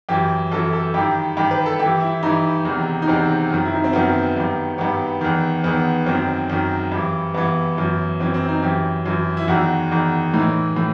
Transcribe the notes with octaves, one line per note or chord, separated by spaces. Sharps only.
F#2 E3 G4
F#2 E3 A4
A4
G2 D#3 G4
G2 D#3 G4
B4
A4
G2 E3 G4
E4
G2 E3 D#4
E2 C3 D#3
D#4
E2 C3 D#3 C4
F#2 D#3
E4
D#4
C4
F#2 D#3 B3
G2 D#3
G2 D#3 B3
E2 D#3
E2 D#3 B3
F#2 D#3 C4
F#2 D#3
G2 E3
G2 E3 B3
F#2 E3
F#2 E3 C4
C4
D#4
F#2 E3 G4
F#2 E3
E4
E2 D#3 F#4
E2 D#3
A2 E3 D#4
A2